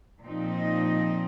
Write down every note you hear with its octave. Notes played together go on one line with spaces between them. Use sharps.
A#2 F3 C4 D#4
D#5